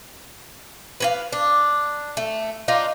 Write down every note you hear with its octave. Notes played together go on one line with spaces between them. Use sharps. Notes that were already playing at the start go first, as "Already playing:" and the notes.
B4 C#5 F5
D4
A3
D4 D#4 F4